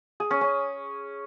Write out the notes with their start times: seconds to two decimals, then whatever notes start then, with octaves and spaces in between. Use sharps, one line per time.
0.20 G#4
0.31 C#4
0.41 C#4